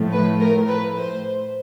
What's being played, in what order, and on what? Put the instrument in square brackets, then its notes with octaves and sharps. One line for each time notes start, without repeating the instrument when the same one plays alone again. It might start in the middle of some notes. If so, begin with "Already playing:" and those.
Already playing: [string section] A2 F3 A3
B4
A#4
B4
C5